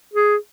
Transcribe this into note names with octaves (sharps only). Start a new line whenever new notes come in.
G#4